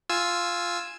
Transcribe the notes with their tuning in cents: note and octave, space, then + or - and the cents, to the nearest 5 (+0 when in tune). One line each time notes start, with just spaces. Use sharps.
F4 +0 G#5 +0 E6 +0